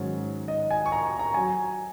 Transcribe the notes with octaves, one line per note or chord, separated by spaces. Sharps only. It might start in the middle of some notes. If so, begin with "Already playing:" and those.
Already playing: G#2 D#3 F#3 C#4
D#5
G#5
C#6
A#5
C#6
A#5
F#3 G#5